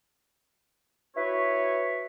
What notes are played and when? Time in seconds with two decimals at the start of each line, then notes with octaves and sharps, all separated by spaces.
1.16 E4 F#4 B4 C#5